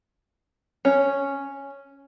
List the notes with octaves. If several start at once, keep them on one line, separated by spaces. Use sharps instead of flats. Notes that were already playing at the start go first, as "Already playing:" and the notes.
C#4